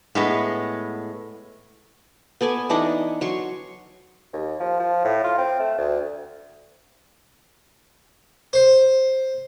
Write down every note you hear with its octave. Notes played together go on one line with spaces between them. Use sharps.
A2 G#3 B3
B3 A4 D5 G#5
E3 D4 D#4 F#5
F#3 C6 C#6
D#2
F3
F3
A2
F4
C4
A3
D2
C5